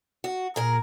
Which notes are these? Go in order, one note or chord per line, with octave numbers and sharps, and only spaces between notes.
F#4
A#2 G#4 A#4 A#5